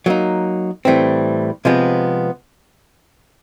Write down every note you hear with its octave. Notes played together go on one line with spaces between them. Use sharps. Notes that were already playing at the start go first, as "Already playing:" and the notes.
F#3 A#3 D#4
A2 E3 G3 C4
C3 F3 G#3 B3